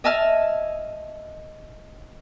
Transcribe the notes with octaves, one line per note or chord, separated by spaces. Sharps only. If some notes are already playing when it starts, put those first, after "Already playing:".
D#5 E5 G#5 A5 E6 F6